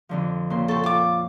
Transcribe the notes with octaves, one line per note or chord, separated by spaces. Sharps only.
F2 D3 F3
A#2 C#3 C6
A4 G5 A5 C6 C#6
F4 D6